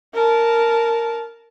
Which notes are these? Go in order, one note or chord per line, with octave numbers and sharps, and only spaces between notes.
A#4 A5